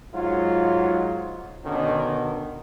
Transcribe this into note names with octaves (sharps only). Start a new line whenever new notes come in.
G#2 F#3 F4
B2 D3 D#3 C#4